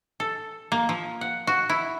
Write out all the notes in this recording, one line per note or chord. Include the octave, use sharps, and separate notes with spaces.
A4
A#3
F3
F#5
F#4
E4